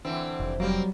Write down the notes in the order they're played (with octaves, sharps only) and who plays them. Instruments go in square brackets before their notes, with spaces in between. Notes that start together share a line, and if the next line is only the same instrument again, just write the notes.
[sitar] D3 E3 C4
[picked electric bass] F1
[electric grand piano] F#3 G3 [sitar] A#3 C4